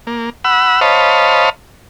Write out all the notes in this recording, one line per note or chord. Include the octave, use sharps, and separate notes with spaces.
A#3
F#5 B5 E6
C5 C#5 D#5 F5 A5 B5